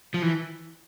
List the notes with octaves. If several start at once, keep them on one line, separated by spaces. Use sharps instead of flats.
F3
E3